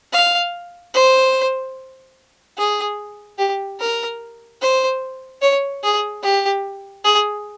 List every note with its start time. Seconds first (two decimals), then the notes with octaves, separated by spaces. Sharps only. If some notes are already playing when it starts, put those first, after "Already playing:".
0.12 F5
0.94 C5
2.58 G#4
3.38 G4
3.80 A#4
4.61 C5
5.41 C#5
5.83 G#4
6.23 G4
7.04 G#4